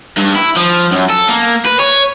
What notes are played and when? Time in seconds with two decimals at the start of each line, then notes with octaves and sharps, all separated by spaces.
0.18 G2
0.36 E4
0.57 F3
0.92 F#2
1.10 A4
1.29 A#3
1.66 B4
1.80 C#5